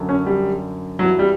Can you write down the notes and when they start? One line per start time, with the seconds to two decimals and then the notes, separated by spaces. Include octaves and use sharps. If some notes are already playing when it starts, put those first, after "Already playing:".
Already playing: F#2 D3
0.09 C#4
0.26 G3
0.99 G2 E3 F#3
1.19 G3